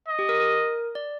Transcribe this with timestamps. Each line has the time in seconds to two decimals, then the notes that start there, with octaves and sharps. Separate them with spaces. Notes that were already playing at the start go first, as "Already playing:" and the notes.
0.08 D#5
0.19 G4
0.29 A#4
0.40 A#4
0.95 D5